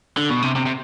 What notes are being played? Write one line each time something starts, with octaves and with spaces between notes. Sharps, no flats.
D3
B2
C3
C3
C3